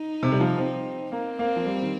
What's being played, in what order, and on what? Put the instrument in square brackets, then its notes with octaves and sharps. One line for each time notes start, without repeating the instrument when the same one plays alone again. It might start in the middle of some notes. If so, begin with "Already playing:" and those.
Already playing: [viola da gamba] D#4
[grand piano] C3
G3
F3
C4
[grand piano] A#3 [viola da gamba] C4
[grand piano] A#3
F3
G3
D#3